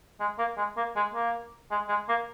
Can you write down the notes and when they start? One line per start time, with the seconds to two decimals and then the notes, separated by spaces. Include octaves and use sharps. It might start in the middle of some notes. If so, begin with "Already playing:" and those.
0.20 G#3
0.38 A#3
0.57 G#3
0.77 A#3
0.96 G#3
1.14 A#3
1.71 G#3
1.89 G#3
2.08 A#3